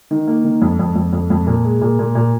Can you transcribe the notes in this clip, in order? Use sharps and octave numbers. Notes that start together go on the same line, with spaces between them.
D#3
A#3
D#3
F2
F2
F2
F2
F2
A#2
G#3
A#2
A#2
A#2